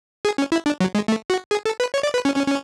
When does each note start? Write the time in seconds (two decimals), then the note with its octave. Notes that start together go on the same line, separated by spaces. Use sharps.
0.25 G#4
0.38 C#4
0.52 E4
0.66 D4
0.80 F#3
0.95 G#3
1.08 A3
1.30 F#4
1.51 G#4
1.65 A4
1.80 B4
1.94 C#5
2.03 D5
2.14 B4
2.25 C#4
2.36 C#4
2.47 C#4